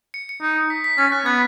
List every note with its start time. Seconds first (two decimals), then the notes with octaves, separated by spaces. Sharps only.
0.14 C#7
0.29 C#7
0.42 D#4
0.70 B6
0.84 B6
0.98 C#4 A6
1.12 F#6
1.26 B3 G#6